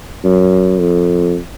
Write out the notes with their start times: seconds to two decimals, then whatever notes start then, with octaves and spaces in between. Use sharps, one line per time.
0.25 F#2
0.79 F2